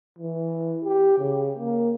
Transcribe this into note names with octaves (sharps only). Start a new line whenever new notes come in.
E3
G4
C#3
A#3